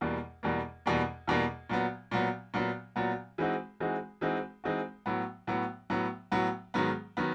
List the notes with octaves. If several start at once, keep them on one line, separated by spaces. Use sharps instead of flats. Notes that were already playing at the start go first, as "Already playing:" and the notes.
E2 B2 G3 A#3
E2 B2 G3 A#3
E2 B2 G3 A#3
E2 B2 G3 A#3
A#2 F#3 B3
A#2 F#3 B3
A#2 F#3 B3
A#2 F#3 B3
E3 G#3 C4 D#4 F#4
E3 G#3 C4 D#4 F#4
E3 G#3 C4 D#4 F#4
E3 G#3 C4 D#4 F#4
A2 F#3 B3
A2 F#3 B3
A2 F#3 B3
A2 F#3 B3
G#2 D#3 F#3 B3
D#3 F#3 B3